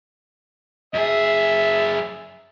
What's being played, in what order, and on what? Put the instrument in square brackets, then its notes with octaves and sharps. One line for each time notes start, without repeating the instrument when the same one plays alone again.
[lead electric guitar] F#2 G#4 [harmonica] E5